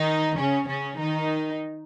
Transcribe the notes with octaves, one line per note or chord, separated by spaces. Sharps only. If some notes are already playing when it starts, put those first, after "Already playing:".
Already playing: D#3 D#4
C#3 C#4
C#3 C#4
D#3 D#4